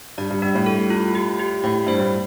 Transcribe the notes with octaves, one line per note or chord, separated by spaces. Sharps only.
G2 D5
G2
G2 D4
A2
A4
F4
G4
G4
A2 G5
G2 C5
A2